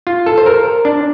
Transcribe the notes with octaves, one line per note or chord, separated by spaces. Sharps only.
F4
A4
C5
A#4
D4